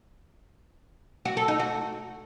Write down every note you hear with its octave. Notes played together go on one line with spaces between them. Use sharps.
F#4
A4
D#4
F#4